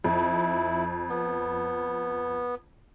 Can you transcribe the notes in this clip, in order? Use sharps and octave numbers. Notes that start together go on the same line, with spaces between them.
F2 E4
B3